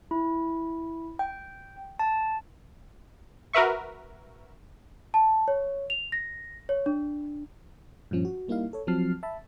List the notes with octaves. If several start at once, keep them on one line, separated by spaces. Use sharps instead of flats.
E4
G5
A5
F#4 A#4 B4 E5 C#6
A5
C#5
F7
A#6
C#5
D4
G2 A#2 F3 C#4
F#4
G3 A#3 D#4 E4 F5
A4 C#5
F3 F#3 C4 A5 F6 C7
E5 A5 B5